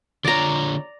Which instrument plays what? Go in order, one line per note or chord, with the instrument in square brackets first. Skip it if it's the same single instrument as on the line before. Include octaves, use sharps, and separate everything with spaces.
[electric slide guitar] D3 F4 C#5 [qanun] D5 A#5